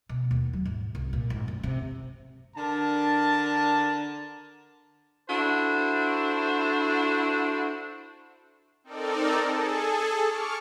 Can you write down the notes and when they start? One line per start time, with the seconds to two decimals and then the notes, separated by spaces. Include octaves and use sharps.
0.09 B2
0.31 D#2
0.53 F#3
0.65 G#2
0.95 C2
1.13 A#2
1.30 G#1
1.48 F#1
1.63 C3
2.56 D3 D4 A#4 A5
5.30 D4 E4 F#4 A4 C5
8.84 C4 D#4 A4 A#4 D5
9.46 G#4 A4
10.23 C#6 D6 F6 C#7